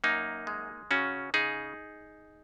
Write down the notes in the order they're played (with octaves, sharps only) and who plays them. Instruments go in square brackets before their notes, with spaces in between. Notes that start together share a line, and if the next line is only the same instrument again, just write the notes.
[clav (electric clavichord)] F#2 A#3 D#4
G#3
C#3 C#4 F#4
C#3 D#4 G#4